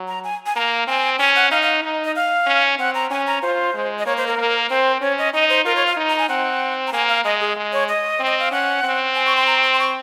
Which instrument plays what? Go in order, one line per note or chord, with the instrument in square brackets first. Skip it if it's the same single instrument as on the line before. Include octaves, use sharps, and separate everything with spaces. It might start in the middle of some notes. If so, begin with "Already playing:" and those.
Already playing: [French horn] F#3
[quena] A#5
G#5
G#5
[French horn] A#3 [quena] A#5
[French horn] C4 [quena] G#5
[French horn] C#4 [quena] G#5
[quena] F#5
[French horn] D#4 [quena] F5
[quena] F5
[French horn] D#4
[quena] D#5
F5
[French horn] C#4
[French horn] C4 [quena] F#5
[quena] A#5
[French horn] C#4 [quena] G#5
[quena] A#5
[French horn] F4 [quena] C5
[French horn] G#3
[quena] D#5
[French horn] A#3 [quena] C#5
[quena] C5
A#4
[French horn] A#3
[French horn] C4 [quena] C5
[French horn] C#4 [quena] C#5
[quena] D#5
[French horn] D#4 [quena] D#5
[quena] C5
[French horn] F4 [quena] A#4
[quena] C#5
F5
[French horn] D#4
[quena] A#5
G#5
[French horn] C4 [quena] F#5
[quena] A#5
[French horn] A#3 [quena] G#5
[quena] F5
[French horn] G#3 [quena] D#5
[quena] G#4
[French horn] G#3
[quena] C#5
D#5
[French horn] C4
[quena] D#5
F5
[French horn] C#4 [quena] F#5
[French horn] C4
[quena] G#5
C#6
C6
A#5
C6
C6
C#6